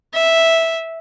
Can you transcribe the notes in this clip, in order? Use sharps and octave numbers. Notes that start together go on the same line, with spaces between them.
E5